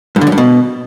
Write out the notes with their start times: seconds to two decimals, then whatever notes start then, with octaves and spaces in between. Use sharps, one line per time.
0.16 G2
0.21 D3
0.27 F#2
0.32 G2
0.38 B2